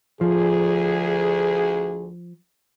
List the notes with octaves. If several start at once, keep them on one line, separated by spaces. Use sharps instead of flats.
D2 F3 G#4